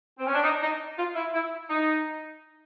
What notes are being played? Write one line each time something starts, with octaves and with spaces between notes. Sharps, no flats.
C4
C#4
D4
D#4
D#4
F4
E4
E4
D#4